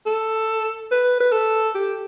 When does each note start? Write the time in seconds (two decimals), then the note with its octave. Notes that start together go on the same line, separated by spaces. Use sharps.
0.06 A4
0.91 B4
1.20 B4
1.32 A4
1.75 G4